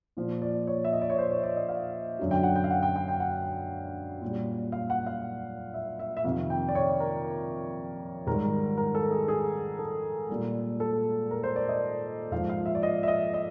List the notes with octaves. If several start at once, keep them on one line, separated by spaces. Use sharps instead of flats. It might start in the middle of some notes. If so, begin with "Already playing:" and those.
A#2 F3
D5
C#5
E5
D#5
D5
C#5
C5
C#5
D5
D#5
F5
F#2 D3 F#3
G5
F#5
G5
F5
F#5
G5
G5
G5
F#5
A#2 G3
F5
F#5
F5
E5
E5
E5
F2 C3 D#3 F5
G5
D5
C#5
A#4
G#2 D#3 G3 A#4
A#4
A4
G#4
G#4
A4
A#2 G3
A4
A#4
C5
D5
D#5
G#2 F3 F5
F5
E5
D5
D#5
E5
D#5
D#5